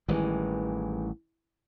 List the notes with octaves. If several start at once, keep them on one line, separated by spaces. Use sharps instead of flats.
A1 D#3 E3 G3 G#3